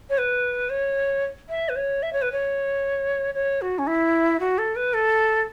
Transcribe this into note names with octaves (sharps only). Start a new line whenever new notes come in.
C#5
B4
C#5
E5
B4
C#5
E5
C#5
B4
C#5
C#5
F#4
C#4
E4
F#4
A4
B4
A4